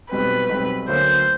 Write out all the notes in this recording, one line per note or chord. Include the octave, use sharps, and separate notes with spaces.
B1 B2 G3 C4 B4
B1 B2 G3 C4
D2 D3 F#3 A#3 C5